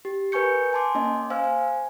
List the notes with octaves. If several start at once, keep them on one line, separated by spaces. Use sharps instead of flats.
G4
A#4 B4 G#5 C#6 G6 C#7
G#5 A5 C6 D6
A#3 C#4 D#5
C5 F5 G#5 E6 F6
G#5